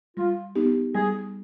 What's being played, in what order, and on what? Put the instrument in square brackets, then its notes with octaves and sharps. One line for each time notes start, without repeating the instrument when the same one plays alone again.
[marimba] G3 [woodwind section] F4
[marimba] B3 D#4 G4
[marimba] G3 [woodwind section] G#4